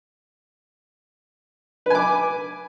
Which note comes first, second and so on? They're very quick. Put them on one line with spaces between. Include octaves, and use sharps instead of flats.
B4 G#5 D6